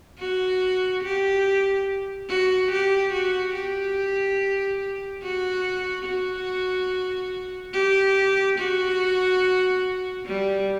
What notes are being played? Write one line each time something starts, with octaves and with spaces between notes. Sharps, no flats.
F#4
G4
F#4
G4
F#4
G4
F#4
F#4
G4
F#4
G3